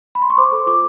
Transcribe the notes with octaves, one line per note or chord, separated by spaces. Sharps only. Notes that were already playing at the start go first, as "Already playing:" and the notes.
B5
C6
C#6
C5 D6
A4
F4 D6